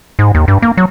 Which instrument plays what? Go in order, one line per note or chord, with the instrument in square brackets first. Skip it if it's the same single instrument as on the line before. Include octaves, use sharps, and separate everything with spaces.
[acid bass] G#2
D#2
G2
A#3
F#3